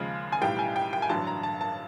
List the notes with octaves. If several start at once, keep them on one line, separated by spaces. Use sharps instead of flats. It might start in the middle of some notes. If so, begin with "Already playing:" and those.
Already playing: D#2 C#3 F3 G#3
G#5
B1 A2 E3 G3 G5
G#5
G5
G5
G#5
A1 G2 D3 F#3 A5
A#5
A5
A5